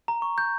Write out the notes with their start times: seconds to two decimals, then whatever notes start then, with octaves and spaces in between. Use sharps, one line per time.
0.08 A#5
0.22 C#6
0.38 G6